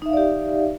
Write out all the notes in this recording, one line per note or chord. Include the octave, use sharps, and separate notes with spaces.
D#4 G4 D5 E5 F5